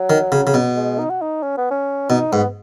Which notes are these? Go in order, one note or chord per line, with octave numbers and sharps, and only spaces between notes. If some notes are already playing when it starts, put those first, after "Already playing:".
Already playing: F#3
D#3
C#3
C#3
B2
G#3
D#4
F#4
D#4
C#4
B3
C#4
B2 D#4
G#2 B3